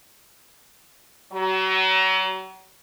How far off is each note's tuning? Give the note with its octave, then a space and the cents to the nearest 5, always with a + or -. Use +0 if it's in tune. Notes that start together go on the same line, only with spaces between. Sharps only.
F#3 +35